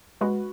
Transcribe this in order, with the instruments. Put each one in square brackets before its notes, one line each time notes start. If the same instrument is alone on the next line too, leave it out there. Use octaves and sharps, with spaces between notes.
[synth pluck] G#3 [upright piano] F#4 B4